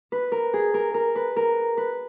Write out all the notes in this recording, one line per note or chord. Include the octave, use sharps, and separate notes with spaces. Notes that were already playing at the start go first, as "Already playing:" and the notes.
B4
A#4
G#4
A#4
A#4
B4
A#4
B4